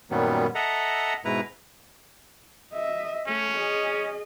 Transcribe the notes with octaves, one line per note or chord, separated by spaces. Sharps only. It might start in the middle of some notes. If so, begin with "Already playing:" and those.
F#2 A#2 D#3 F#3 G3 B3
A4 D#5 E5 F#5 A#5
G#2 B2 E4 B4 A#5
D#5 E5
A3 C#4
G#4 D#5